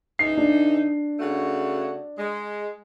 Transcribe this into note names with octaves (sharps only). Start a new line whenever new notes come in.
C#3 E3 D#4 C7
D4
C#3 A3 F#4
G#3